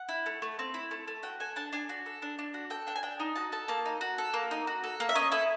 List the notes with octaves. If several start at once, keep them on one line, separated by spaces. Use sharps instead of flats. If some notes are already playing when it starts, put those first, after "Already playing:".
Already playing: F#5
E4
A3
A3
C4
E4
A3
A3
F#4 G5
A4 G#5
D4 A5
D4 G#5
F#4
A4
D4
D4
F#4
A4 G5
D4 G5
G#5
D4 G5
D#4
F#4 A5
A4 A5
A#3 A5
D#4
F#4
A4
A#3
D#4
F#4
A4
A#3
E5
C#4 D#5
E4 A4